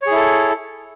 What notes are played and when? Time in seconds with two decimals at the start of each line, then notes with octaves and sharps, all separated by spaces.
0.02 C#5
0.07 G#4
0.11 E4
0.16 A4